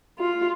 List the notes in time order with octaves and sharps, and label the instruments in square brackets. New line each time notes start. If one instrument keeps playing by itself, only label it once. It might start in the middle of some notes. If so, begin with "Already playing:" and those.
[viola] F4